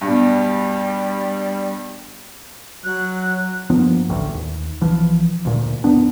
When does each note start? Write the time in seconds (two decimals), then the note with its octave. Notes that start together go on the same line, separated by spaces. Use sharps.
0.01 G2 B2 G3
2.84 F#3 F#6
3.70 G2 F3 A#3 B3
4.09 A1 D2
4.35 D#2
4.81 B1 E3 F3
5.45 D2 A#2
5.84 D1 F#2 B3 D4